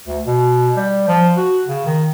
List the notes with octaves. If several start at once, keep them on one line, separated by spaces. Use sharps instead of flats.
D2
B2
G3
F3
F#4
C#3
D#3